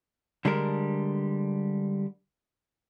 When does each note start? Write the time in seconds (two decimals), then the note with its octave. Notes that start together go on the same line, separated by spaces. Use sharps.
0.45 D3 G3 G#3 D4 A#4